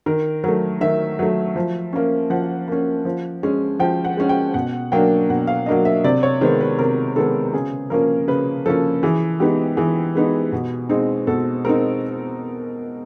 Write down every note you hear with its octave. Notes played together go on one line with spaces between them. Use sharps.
D#3 A#4
F#3 A3 A#4
D#3 E5
F#3 A3
F3
A#3 C#4
F3 F#5
A#3 C#4
F3
G#3 C#4
F3 G5
F#5
G#3 C#4
G5
B2 F#5
F#3 A#3 D4 G5
B2 F#5
F5
F#3 A#3 D4 D#5
E5
C3 D5
C#5
D#3 G#3 B3 C5
B4
C3 A#4
D#3 G#3 B3 A4
C#3 G#4
F3 A#3 C#4 A#4
C#3 B4
F3 A#3 C#4 A4
E3 G#4
G#3 B3 D#4 G4
E3 G#4
G#3 B3 D#4
B2
G#3 C4 D#4
B2 A4
G#3 C4 D#4 A#4